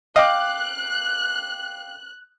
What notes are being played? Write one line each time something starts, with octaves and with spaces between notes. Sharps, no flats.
D#5 F5 G5 D6 F#6